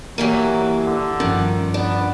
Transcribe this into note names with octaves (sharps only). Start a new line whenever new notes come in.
E3 F#3 G3 A#3
D3
G2 D#3 F3 C#4
B3 D4